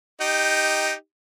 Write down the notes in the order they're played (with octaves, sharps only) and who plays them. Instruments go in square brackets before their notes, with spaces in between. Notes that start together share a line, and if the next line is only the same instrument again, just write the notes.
[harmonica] D#4 G4